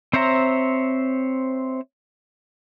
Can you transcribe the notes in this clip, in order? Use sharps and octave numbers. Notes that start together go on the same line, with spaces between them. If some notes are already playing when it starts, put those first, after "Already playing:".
C4 C5 C#5 E5 A#5